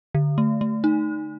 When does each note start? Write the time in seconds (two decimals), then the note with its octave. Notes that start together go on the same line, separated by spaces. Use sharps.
0.15 D3
0.38 A3
0.61 A3
0.84 D#4